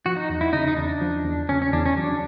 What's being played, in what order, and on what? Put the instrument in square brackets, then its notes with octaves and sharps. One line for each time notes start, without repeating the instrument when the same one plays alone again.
[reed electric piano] F3 [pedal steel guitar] F#4
[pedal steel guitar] D#4
[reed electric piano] E2
[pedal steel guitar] E4
[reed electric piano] C#3 [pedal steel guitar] D#4
[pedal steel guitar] D#4
[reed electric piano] E2 [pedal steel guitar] D4
[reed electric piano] F3
E2
[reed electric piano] C#3 [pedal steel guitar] C#4
[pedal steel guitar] C#4
[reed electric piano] E2 [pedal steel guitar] D4
[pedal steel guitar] C#4
[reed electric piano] F#3 [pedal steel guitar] D4